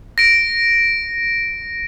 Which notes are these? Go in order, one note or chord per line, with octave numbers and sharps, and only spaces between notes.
A#6 D7